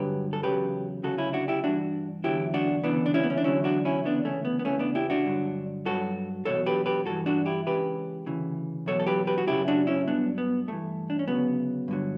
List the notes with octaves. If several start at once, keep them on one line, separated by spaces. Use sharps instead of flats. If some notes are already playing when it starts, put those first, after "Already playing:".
Already playing: G2 D3 F#3 G4 B4
A4
E2 C#3 F#3 G4 B4
D2 C#3 F#3 F#4 A4
C#4 E4
D4 F#4
E4 G4
G2 E3 D4 F#4
E2 D3 F#3 E4 G4
D4 F#4
D2 C#3 E3 B3 D4
D4
C#4 E4
B3
C#4
D4
E2 D3 F#3 C#4 E4
D4 F#4
C#4 E4
D2 C#3 E3 B3 D4
A3 C#4
B3
B3
E2 C#3 E3 A3 C#4
B3 D4
E4 G4
D4 F#4
G2 D3 F#3
G2 F#3 F#4 A4
E2 B2 F#3 A4 C#5
G4 B4
G4 B4
G2 E3 F#4 A4
D4 F#4
E4 G4
C#2 C#3 E3 G4 B4
D2 C#3 E3
E2 B2 F#3 A4 C#5
A4
G4 B4
G4 B4
F#4
F#2 C#3 F#3 E4 G4
D4 F#4
C#4 E4
G2 F#3 B3 D4
B3
G2 E3 A3
D4
C#4
D2 C#3 F#3 B3
G2 D3 F#3